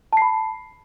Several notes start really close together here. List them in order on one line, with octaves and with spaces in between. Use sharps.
A5 C7 B5